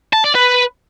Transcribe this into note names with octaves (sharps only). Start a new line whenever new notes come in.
A5
D5
B4